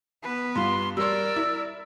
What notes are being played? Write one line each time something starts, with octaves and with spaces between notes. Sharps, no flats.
B3 B4
G2 F4 C6
G3 A#4 D5 E6
E4